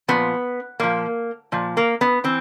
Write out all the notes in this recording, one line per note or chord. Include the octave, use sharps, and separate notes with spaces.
A#2 F3 B3
A#2 F3 A#3
A#2 F3
A#3
B3
E3 C4